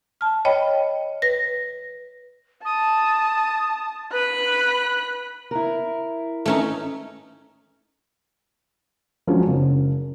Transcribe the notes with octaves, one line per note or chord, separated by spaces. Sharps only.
A5 F6
C#5 D#5 G5 B5
B4 A#6
A5 D#6
B4 B5 F#6
E4 A#4
A3 C#4 D#4
F3 F#3 G#3 C#4 D4
F#1